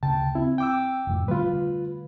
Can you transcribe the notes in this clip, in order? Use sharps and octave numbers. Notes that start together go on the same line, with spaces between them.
D2 C#3 G5 A5
C4 E4
G5 D6 E6
F1 F2 A2
D3 G3 A3 F4 B4